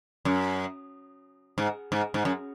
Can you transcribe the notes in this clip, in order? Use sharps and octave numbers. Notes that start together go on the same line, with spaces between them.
F#2
G#2
G#2
G#2
F#2